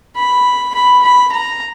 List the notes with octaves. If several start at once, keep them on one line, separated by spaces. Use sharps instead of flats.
B5
B5
B5
A#5